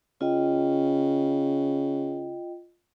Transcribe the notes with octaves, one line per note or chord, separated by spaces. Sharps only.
C#3 F4 D#5 G5